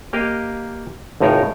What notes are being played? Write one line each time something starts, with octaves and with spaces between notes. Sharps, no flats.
A#3 G4 A#4 D#5 F5
G#1 C#2 A2 D#4 A#4 C#5